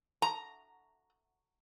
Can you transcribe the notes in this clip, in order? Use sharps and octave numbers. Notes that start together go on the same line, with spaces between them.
A#5